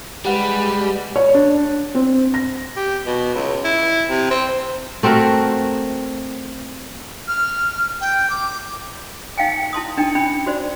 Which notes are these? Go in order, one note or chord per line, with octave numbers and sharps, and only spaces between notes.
G3 G#3 G4 B4 F#5
C#5
D4
C4
A#6
G4
B2
C#2
E4
C3
C4
A3 C4 F#4 A#4
F6
G5
D6
D#4 F5 G5 G#5
E4 A5 C6 D#6
D4 D#4 G5
C#4 D4 G5 G#5 B5
F#4 C5 D5